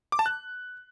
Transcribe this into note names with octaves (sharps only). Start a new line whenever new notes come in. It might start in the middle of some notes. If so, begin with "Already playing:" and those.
D6
A5
F#6